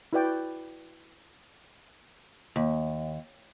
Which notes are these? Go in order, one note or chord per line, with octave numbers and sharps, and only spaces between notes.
E4 F#4 B4 D5 G5
D#2